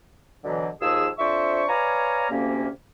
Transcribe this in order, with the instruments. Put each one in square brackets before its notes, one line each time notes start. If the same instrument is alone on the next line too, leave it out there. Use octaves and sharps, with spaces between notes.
[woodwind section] B2 D3 E3 F#3
D#2 F3 G#4 E6
F2 D4 C5 E5 C#6
B4 C#5 D5 F5 G#5 A#5
D2 C3 A#3 C#4